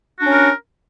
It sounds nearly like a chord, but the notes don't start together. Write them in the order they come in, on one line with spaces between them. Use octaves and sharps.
F#4 D4 C#4 A#4